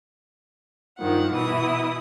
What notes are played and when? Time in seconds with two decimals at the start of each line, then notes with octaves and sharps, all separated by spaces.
0.98 G2 D#3 F3 F#5
1.32 B2 E3 E4 D#6